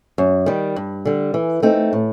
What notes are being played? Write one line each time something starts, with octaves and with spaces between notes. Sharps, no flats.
F#2
D#3 G3
G2
D3 G3
E3
A3 C4 D#4
A2